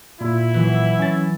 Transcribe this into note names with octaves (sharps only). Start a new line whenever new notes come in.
A#2 E4
E3 F#3
C#4 A6